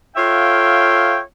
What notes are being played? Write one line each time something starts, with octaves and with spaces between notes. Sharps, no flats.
F4 A4 C#5 E5 F5 G5